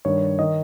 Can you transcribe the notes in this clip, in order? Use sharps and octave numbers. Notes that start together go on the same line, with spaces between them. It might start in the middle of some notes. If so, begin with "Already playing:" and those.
G2 D#3 C#5
D#3 D#5